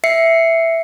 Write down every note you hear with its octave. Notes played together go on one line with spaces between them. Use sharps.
E5 C7 C#7